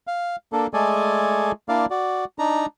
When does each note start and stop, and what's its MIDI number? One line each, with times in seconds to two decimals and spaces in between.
0.07 0.36 77
0.53 0.67 58
0.53 0.67 62
0.53 0.67 69
0.74 1.52 56
0.74 1.52 57
0.74 1.52 68
0.74 1.52 69
0.74 1.52 74
0.74 1.52 80
1.69 1.86 58
1.69 1.86 62
1.69 1.86 64
1.69 1.86 74
1.69 1.86 77
1.90 2.25 66
1.90 2.25 74
2.39 2.66 62
2.39 2.66 63
2.39 2.66 82